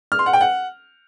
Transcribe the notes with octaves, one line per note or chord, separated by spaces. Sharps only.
F6
C6
F#5
G5
F#5